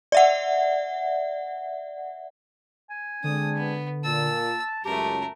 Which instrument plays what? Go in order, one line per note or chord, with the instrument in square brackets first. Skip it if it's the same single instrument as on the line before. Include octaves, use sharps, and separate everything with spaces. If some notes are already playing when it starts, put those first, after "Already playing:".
[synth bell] D5 E5 F#5
[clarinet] G#5
[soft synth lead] D3 [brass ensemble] G#3 C4 D4 [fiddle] D#6
[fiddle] B3
[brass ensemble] A#2 [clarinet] A5 [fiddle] E6
[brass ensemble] C#2 F#2 [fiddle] A3 A#4 [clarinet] G4 [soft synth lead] A5